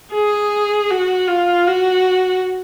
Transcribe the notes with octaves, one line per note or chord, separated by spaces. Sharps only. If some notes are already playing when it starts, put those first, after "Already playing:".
G#4
F#4
F4
F#4